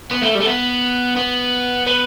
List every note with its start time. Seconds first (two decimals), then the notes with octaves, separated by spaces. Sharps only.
0.11 B3
0.22 A3
0.35 G3
0.41 A3
0.46 B3
1.17 B3
1.87 B3